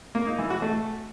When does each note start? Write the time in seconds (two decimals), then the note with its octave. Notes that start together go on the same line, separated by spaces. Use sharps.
0.15 A#3
0.27 D#4
0.38 E3
0.50 F#4
0.62 A3